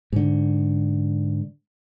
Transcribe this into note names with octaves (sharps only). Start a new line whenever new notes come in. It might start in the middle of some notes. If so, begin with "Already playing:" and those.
G#2 D3